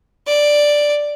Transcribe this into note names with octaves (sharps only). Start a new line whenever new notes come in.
D5